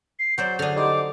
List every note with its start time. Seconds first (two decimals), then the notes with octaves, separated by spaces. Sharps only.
0.19 C7
0.38 F#3 C5 D5 G6
0.59 D3 D4 D#6 F6
0.76 G3 D#4 C5 D6